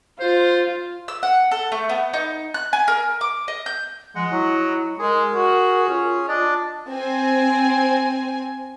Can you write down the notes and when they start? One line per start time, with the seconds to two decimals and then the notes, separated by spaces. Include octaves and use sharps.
0.20 F4 C5
1.08 E6
1.23 F#5
1.51 A4
1.72 A3
1.89 B3
2.13 D#4
2.54 F#6
2.73 G#5
2.88 A#4
3.21 D6
3.48 D#5
3.66 G6
4.16 F3 G#3 D#5 F#5
4.30 F#3 E4
4.99 G#3 G#4 A#4
5.34 F#4
5.89 C#4 F4
6.28 D4 D5 D#5
6.90 C4 G#5